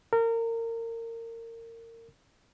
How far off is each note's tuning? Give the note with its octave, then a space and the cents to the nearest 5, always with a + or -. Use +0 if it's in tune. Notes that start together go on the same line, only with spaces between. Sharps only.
A#4 -25